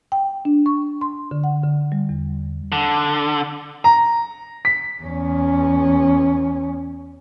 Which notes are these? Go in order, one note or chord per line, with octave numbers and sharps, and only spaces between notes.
G5
D4
C#6
C6
D3
F#5
D3
G3
E2
D3
A#5
B6
E2 C#4